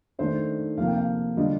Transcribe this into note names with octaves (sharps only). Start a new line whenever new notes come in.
D#3 A3 D4 C5
C3 F3 A#3 F5
G5
F5
D3 G3 D4 F4 D#5